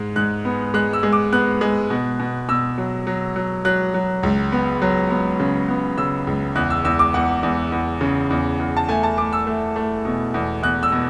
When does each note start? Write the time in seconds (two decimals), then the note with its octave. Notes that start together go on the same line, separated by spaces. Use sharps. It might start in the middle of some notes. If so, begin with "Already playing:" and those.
Already playing: G#2 G#3
0.16 G#2 F#6
0.45 B3
0.74 G#3 F#6
0.93 E6
1.03 G#3
1.13 D6
1.32 B3 F#6
1.61 G#3
1.90 B2
2.19 B2
2.48 B2 E6
2.78 F#3
3.07 F#3
3.36 F#3
3.65 F#3 F#6
3.94 F#3
4.23 C#2
4.52 B3
4.82 F#3
5.11 B3
5.40 C#3
5.69 B3
5.98 C#3 E6
6.27 C#2
6.55 E2 F#6
6.70 E6
6.85 E2 E6
6.99 D6
7.14 E2 F#5
7.43 E2
7.72 E2
8.01 C#3
8.30 E2
8.59 E2
8.77 A5
8.89 A3 G#5
9.03 A5
9.17 A3 D6
9.33 E6
9.47 A3
9.76 A3
10.05 B2
10.34 E2
10.63 E2 F#6
10.83 E6
10.92 B2